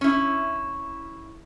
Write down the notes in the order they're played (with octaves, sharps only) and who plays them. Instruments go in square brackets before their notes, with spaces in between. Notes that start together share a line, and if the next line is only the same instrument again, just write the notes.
[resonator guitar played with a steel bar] C#4 E4